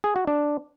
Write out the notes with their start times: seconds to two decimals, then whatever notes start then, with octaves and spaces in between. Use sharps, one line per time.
0.04 G#4
0.16 F#4
0.27 D4